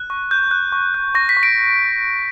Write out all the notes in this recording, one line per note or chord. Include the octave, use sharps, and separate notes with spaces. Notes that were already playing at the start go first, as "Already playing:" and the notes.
Already playing: F#6
C#6
F#6 G6
F#6
C#6
F#6
C#6 A#6
B6
C#6
D7